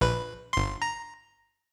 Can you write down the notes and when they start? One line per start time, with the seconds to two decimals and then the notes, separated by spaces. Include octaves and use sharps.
0.01 A#1 B4
0.53 G1 C6
0.82 A#5